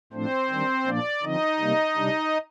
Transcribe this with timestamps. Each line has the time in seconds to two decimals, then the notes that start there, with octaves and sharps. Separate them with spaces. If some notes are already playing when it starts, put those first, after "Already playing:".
0.13 A2 F3 A3 C4 D4 C5
0.50 D#3 G3 D4
0.86 A#2 F3 A#3 D4 D5
1.23 D3 F3 C4 D#4 D#5
1.60 C3 G3 A#3
1.96 C3 G3 D4